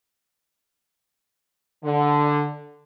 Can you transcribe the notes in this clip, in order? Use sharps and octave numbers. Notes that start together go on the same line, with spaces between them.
D3